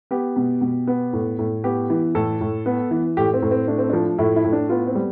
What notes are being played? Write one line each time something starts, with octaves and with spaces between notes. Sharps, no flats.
B3 G4
B2
B2
B3
A2
A2
B3 G4
E3
A2 A4
A2
B3
E3
A2 G4
C4
A2
C4
A3 D4
C4
F3 D4
A2 E4
E4
A2
D4
B3 F4
C4
G3